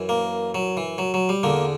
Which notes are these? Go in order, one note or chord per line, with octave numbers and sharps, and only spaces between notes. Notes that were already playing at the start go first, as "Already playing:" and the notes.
Already playing: F#2 E3
A#3
F#3
E3
F#3
F#3
G3
E2 D3 A#3